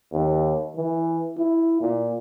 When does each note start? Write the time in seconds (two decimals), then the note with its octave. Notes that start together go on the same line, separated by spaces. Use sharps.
0.12 D#2
0.76 E3
1.37 E4
1.81 A#2